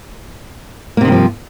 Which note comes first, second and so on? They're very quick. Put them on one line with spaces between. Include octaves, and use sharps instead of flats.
A#3 C3 D#3 G2 F3